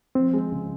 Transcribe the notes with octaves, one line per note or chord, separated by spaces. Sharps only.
F3 C4
G#3
C#3